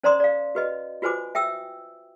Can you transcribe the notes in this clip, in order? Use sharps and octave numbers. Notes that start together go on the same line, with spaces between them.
C#4 C5 D5 A#5 C6 D#6
D5 F5
F#4 B4 D#5
F4 F#4 B4 C5 G#5 D6
E5 G5 D#6 E6